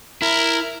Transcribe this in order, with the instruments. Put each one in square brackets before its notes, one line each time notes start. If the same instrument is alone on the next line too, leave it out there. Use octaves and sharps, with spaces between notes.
[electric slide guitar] E4 [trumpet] A#4